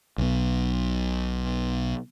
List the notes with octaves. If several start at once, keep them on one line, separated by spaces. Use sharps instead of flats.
B1 B2